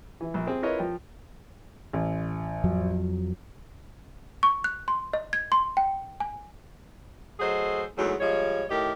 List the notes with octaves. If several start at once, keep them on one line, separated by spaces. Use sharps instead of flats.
E3
A#1
C4 G#4
E4 F4 A#4 B4 C#5 D#5
F3 G5
A1
F2 F3 F#3
C#6
F#6
C6
D#5
G#6
C6
G5
G#5
F#3 A3 G#4 C5 D#5
E2 G#2 F#3 G#3 A3
F3 G3 G#3 C#5
A2 D#3 G4 A#4 D#5